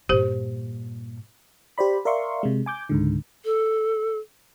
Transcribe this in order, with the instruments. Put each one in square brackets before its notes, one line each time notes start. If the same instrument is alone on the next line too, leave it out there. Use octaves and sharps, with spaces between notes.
[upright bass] G2 A#2 [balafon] G4 C5
[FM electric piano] G4 C5 D5 B5
A#4 D5 E5 F5 C6 C#6
C3 G#3
G#5 D6 G6
C#2 G#2 D3
[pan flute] A4